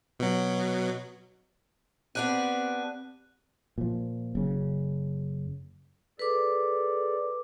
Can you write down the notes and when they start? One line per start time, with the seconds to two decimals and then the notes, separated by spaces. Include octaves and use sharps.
0.19 B2 F#3
2.15 B3 C4 D4 G4 F#6 D#7
3.78 A#2 F3
4.35 F#1 C#3
6.19 G#4 A4 B4 D5 D6